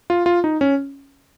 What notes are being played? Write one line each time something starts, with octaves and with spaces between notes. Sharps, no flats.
F4
F4
D#4
C#4